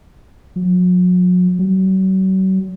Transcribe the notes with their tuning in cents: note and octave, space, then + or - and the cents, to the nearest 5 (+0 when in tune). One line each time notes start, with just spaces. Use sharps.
F#3 -40
F#3 +40